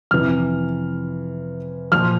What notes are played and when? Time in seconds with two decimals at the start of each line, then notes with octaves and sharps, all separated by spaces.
0.11 F2 C3 E3 F6
1.92 A#2 F3 F6